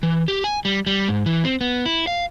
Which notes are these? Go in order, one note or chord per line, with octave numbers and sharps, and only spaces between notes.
E3
G4
G#5
G3
G3
G#2
E3
C4
B3
E4
F5